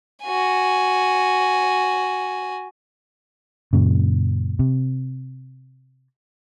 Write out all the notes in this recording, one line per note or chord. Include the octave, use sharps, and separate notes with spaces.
F#4 G#5
F#2 A#2 C#3
C3